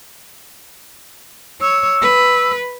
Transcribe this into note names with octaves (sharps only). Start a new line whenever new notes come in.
C#5 E6
B4